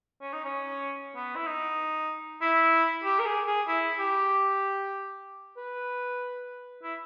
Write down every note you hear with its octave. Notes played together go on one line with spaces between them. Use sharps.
C#4
D#4
C#4
B3
E4
D#4
E4
G4
A#4
G#4
G#4
E4
G4
B4
E4